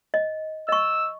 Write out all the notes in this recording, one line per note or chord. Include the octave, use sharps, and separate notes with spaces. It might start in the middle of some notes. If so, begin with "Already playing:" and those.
D#5
D#5 C#6 E6